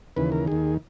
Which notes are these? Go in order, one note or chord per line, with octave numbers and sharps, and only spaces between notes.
D#2 C#3 E3 B4
A#4
D#2 D#3 G#4